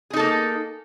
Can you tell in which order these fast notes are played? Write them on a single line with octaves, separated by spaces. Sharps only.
G#4 D#4 A4 A#3